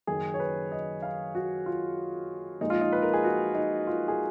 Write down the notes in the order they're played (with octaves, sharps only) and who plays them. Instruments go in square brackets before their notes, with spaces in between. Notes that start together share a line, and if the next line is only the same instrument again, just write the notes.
[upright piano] F#1 F#2 D#3 G#4
C#5
B4
D#5
F5
F#4
F4
A#1 A#2 G#3 D#4
F4
D#4
B4
A#4
G#4
F#4
D#4
F4
G#4